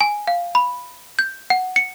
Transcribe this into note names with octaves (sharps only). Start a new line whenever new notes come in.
G#5
F5
B5
G6
F#5
C#7